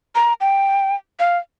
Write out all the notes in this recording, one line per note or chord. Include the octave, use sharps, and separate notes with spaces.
A#5
G5
F5